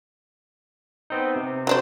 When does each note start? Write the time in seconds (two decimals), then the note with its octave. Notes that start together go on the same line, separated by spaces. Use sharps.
1.10 B3 C4 D#4
1.36 C3
1.67 F#3 D4 C5